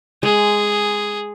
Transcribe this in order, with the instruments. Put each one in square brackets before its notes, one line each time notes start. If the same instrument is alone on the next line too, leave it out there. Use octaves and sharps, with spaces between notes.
[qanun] G#3 [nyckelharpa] G#4